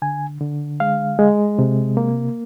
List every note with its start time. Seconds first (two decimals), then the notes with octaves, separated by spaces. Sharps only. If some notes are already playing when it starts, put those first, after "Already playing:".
0.02 D3 G#5
0.41 D3
0.80 G#3 F5
1.19 G#3
1.59 C3
1.97 A#3